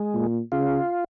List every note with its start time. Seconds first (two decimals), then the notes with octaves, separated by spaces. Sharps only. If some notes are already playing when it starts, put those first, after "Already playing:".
Already playing: G#3
0.14 A#2
0.52 C#3 F4